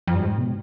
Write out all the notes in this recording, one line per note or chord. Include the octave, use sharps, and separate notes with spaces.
F2
G2
G#2
B2